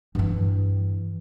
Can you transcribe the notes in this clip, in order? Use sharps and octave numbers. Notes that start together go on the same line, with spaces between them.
G2 E3